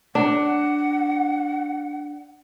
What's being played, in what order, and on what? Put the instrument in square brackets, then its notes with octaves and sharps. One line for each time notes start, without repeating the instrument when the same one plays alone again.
[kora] D4 [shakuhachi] F#5